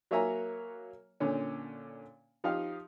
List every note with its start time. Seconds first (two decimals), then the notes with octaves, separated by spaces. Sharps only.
0.11 F#3 A#3 C#5 E5 G#5 A#5
1.20 A#2 D3 C#4
2.44 F3 D#4 G4 F5